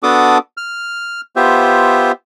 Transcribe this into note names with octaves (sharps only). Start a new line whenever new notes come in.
B3 D4 F#4 A4 D6 D#6
F6
B3 F4 G4 C5 E5